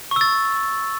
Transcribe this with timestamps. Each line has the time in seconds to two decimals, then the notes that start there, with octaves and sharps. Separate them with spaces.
0.11 C#6
0.16 E6
0.21 A6